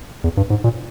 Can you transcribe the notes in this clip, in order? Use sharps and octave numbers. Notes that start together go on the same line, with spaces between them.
E2
G2
G#2
A#2